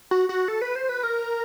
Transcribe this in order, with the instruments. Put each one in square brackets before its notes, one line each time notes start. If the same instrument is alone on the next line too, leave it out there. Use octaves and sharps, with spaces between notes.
[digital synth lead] F#4
F#4
A4
B4
C5
B4
A#4